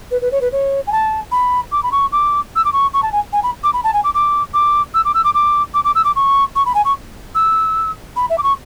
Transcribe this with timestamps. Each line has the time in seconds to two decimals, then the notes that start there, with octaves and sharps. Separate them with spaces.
0.11 B4
0.21 B4
0.31 C#5
0.41 B4
0.52 C#5
0.87 G#5
0.92 A5
1.31 B5
1.72 D6
1.83 B5
1.91 C#6
2.12 D6
2.55 E6
2.64 D6
2.72 C#6
2.93 C#6
3.02 A5
3.12 G#5
3.33 G#5
3.43 B5
3.63 D6
3.73 B5
3.84 A5
3.93 G#5
4.04 D6
4.14 D6
4.53 D6
4.94 E6
5.04 D6
5.14 E6
5.24 D6
5.34 D6
5.74 D6
5.84 D6
5.95 E6
6.04 D6
6.15 C#6
6.55 C#6
6.65 B5
6.74 G#5
6.84 C#6
7.35 E6
8.16 B5
8.29 E5
8.38 D6
8.43 C#6